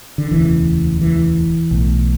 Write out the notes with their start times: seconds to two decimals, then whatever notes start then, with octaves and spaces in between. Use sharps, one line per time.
0.18 D3
0.31 E1 D2 C#3 E3
1.01 E3
1.71 B1 A2